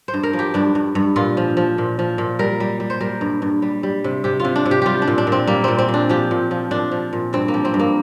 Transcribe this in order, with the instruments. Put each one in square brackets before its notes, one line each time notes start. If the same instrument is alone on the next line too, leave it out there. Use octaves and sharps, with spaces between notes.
[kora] C5
G2
A#4
F3
G4
G2 D4
G2
G2
A#2 F4
F3
F3
A#2
F3
A#2
G3 A#4
G3
G3
C5
G3 A#4
G2
G2
G3
G3
C3
C3 G4
C3 F4
D4
C3
G4
G3 F4 G4
D4
A#2
D4
A#2
C4
G3 A#3
A#2 C4
C4
A#2
D4
F3 G4
A#2
F3
A#2 D4
F3
A#2
G2 C4
A#3
F3
C4
G2
A#3